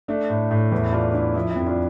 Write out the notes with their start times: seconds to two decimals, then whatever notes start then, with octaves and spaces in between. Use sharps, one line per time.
0.08 A3 D4
0.30 A2
0.51 A2
0.72 E2 E4
0.92 D3 D4 F4
1.14 D3 E4
1.34 F3 E4
1.50 E4
1.56 F2
1.66 D4 F4